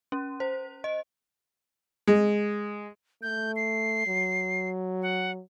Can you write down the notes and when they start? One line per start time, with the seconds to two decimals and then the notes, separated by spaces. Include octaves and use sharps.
0.12 C#4
0.40 C5
0.84 D#5
2.07 G#3
3.22 A3 G6
3.56 C7
4.07 F#3
5.02 F#5